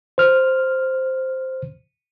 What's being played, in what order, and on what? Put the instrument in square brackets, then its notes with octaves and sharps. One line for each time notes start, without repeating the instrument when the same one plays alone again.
[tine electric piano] C5 F6